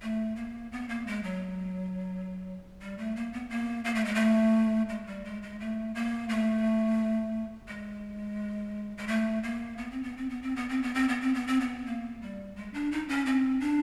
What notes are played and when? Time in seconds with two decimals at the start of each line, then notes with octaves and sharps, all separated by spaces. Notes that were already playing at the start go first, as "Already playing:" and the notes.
0.02 A3
0.36 A#3
0.72 B3
0.89 A#3
1.07 G#3
1.24 F#3
2.81 G3
2.98 A3
3.16 A#3
3.33 B3
3.50 A#3
3.85 A#3
3.95 A3
4.05 G#3
4.15 A3
4.89 G#3
5.07 G3
5.25 G#3
5.43 G#3
5.60 A3
5.95 A#3
6.29 A3
7.68 G#3
8.98 G#3
9.07 A3
9.43 A#3
9.78 B3
9.91 C4
10.03 B3
10.17 C4
10.29 B3
10.42 C4
10.56 B3
10.69 C4
10.83 B3
10.95 C4
11.09 B3
11.21 C4
11.35 B3
11.47 C4
11.60 B3
11.86 A#3
12.22 G3
12.56 G#3
12.74 D4
12.92 D#4
13.09 C#4
13.26 C4
13.60 D4